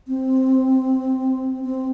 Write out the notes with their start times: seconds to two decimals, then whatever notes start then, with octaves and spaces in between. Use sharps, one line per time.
0.08 C4
1.65 C4